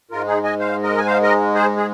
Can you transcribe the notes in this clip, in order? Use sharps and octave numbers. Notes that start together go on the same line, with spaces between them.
G#2 G#3 F4 A#4
D#4 G#4
D#5 G#5
C5 F5
A#4 D#5
G#5
C5 F5
A#4 D#5
G#4 C5
G#4